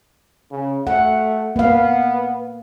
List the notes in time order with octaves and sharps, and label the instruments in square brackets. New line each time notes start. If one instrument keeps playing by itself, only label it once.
[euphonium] C#3
[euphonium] A3 [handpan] F#5
[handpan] A#3 F5 [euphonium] B3